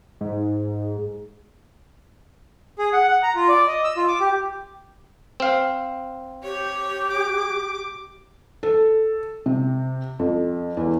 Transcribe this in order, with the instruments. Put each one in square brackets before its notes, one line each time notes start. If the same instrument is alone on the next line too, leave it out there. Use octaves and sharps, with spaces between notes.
[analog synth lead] G#2
[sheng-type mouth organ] G#4
F#5
F#5
A#5
F4
D5
D#5
E6
F4
D6
G4
[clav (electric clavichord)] C4 F5
[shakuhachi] G4 [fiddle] C#5
[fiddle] D6
[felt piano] A4
C3
F2
E2